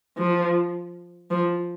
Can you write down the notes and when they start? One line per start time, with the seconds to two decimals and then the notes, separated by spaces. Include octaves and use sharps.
0.18 F3
1.31 F3